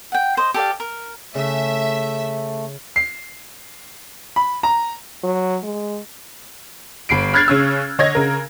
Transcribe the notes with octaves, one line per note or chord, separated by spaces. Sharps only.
F#5 G5
C5 D#5
G4 A4 D5 F5
A#4
C#3 A3 E5
C7
B5
A#5
F#3
G#3
G1 B5 C7 D7
B5 F6 F#6 G#6 A6 C7
C#3 C#4 E6
D3 C#5 D#5 G#6 A#6
C#3 A#4